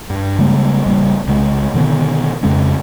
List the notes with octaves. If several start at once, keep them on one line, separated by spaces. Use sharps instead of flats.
G2
C#3 G3 G#3 A#3
A1 C#3 G3 A#3
C2 C#3 G#3
B2 D3 D#3 B3
F2 C#3 G#3 C#4